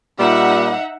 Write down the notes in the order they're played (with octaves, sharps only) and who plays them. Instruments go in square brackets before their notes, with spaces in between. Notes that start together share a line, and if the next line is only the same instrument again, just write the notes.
[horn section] A#2 G3 [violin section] D#4 E5 F#5